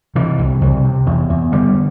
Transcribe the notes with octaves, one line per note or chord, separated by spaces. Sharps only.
C3 E3
C2
C2
C3
E2
E2
D3 G3